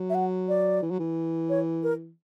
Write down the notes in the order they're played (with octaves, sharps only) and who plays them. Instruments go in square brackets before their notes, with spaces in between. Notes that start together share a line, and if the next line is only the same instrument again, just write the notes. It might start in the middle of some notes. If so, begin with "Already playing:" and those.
Already playing: [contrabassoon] F#3
[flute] E5
F#5
D5
[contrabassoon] E3
F#3
E3
[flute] C#5
A#4